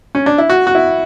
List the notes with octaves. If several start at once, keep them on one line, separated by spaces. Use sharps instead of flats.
C#4
D4
E4
F#4
F#4
E4